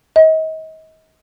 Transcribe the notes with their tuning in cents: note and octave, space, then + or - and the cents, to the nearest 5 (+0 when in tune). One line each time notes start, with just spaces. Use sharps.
D#5 +35